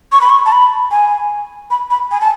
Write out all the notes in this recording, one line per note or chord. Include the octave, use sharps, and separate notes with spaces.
C#6
B5
C#6
A5
B5
G#5
B5
B5
G#5
A5